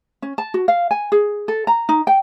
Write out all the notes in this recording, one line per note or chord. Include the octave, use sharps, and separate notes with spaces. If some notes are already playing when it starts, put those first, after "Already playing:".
C#4
A5
F#4
F5
G#5
G#4
A4
A#5
D#4
G5